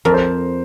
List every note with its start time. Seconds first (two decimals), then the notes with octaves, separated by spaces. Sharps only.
0.05 F2 A#4
0.14 C5